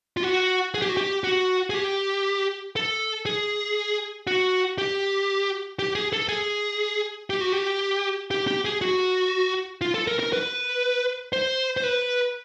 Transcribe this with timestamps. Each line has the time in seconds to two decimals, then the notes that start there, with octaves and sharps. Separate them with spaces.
0.17 F4
0.23 F#4
0.74 G#4
0.82 G4
0.89 F#4
0.97 G4
1.24 F#4
1.70 G#4
1.74 G4
2.76 A4
3.26 G#4
4.27 F#4
4.78 G4
5.79 G4
5.95 G#4
6.13 A4
6.29 G#4
7.30 G4
7.41 F#4
7.53 G4
8.31 G4
8.47 G4
8.65 G#4
8.81 F#4
9.81 F4
9.94 A4
10.07 A#4
10.19 A#4
10.33 B4
11.33 C5
11.77 C5
11.84 B4